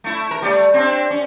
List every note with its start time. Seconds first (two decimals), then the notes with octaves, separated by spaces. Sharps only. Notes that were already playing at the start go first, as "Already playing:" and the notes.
0.04 A3 E4
0.31 A#4
0.42 G3 A3 D5
0.74 C4 D4
1.11 C#4